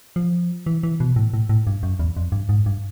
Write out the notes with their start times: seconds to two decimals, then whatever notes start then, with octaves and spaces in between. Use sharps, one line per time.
0.16 F3
0.66 E3
0.83 E3
1.00 B2
1.16 A2
1.34 A2
1.49 A2
1.67 G2
1.83 F#2
1.99 E2
2.17 F2
2.32 G2
2.49 G#2
2.66 G2